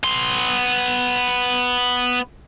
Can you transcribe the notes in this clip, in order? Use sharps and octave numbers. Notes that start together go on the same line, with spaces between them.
B3 C6